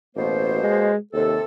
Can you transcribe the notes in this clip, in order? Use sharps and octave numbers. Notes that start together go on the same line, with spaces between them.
A1 B2 A#3 C5
G#3
D#2 C3 A4